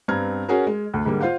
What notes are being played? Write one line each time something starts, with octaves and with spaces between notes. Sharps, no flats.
G2 B3 C4 A#5 F6 G#6
C#4 F#4 G#4 A#4
G#3
D2
G#2 D3 G3 A#3
F4 C5 F5 F#5